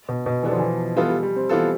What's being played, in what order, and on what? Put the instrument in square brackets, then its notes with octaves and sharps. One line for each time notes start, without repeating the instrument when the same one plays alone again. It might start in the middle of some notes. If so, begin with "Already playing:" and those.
[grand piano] B2
B2
[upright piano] D3 G3 B3 D4 A4 [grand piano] E3
[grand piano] F3
E3
[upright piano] E3 B3 F4 A4 [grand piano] G3
[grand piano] G3
G3
C4
[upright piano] E3 B3 F4 A4